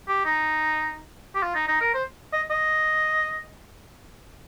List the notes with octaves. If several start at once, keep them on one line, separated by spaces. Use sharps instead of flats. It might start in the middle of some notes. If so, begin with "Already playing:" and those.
G4
D#4
G4
F4
D#4
D#4
A#4
C5
D#5
D#5